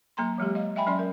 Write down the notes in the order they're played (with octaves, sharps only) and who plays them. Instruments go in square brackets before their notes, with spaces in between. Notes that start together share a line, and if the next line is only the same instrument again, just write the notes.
[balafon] F#3 A#3 A#5 C6
E3 F#3 G#3 G4
D#5 F5
D#5 E5 G5 G#5 B5
F#3 C#4 D5 B5 C6
A#4